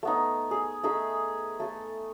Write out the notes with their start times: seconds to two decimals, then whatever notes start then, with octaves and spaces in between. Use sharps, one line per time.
0.03 A3 B3 D#4
0.51 G#4
0.83 A3 D#4 G#4 E5
1.60 A3 A4